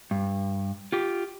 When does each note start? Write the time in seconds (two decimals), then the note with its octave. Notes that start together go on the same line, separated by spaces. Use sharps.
0.11 G2
0.92 F4 G4